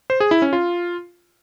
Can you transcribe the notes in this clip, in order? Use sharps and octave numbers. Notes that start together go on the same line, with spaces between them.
C5
G#4
E4
C#4
F4